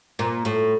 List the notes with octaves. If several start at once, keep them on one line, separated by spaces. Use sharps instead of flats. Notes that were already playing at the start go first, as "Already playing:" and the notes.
A#2
A2